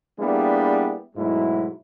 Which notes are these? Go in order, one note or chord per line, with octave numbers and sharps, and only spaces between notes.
G3 A#3 B3 D4 E4 G#4
G#2 B2 F#3 G#3 A3 E4